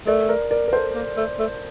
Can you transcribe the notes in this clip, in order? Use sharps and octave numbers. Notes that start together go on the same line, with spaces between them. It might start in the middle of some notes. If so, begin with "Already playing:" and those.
A3 A#4 D5
A#4 D5
A#4 D5
A#4
A4 C5
A#3
A3
A3